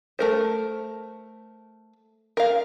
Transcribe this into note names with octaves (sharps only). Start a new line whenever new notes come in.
A3 A#4 C5
A#4 F5